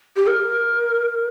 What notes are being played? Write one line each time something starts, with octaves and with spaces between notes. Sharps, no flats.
G4
A#4